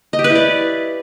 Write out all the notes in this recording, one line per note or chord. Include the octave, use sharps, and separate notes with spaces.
D#5
G4
B4
E4
D5